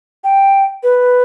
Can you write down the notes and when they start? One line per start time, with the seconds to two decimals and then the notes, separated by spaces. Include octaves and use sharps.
0.24 G5
0.83 B4